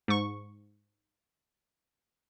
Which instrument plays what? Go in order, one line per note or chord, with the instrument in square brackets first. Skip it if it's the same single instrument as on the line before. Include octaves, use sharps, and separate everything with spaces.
[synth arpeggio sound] G#2 C#6